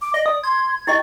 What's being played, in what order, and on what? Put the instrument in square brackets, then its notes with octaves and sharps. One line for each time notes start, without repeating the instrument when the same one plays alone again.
[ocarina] D6
[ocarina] D5 [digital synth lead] D#5
[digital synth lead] D#6
[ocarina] C6 [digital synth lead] G#6
[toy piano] E4 G4 D#5 [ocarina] G5